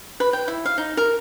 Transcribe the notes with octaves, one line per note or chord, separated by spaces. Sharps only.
B4
G5
E4
F5
D#4
A#4